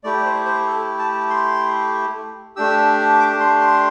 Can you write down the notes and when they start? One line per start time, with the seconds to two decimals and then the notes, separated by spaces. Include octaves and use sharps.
0.04 A3 E4 G4 D5
0.25 C5
0.46 C5
0.67 A4
0.99 A5
1.30 C6
2.56 A3 D4 G4 E6
3.19 D6
3.40 C6
3.61 C6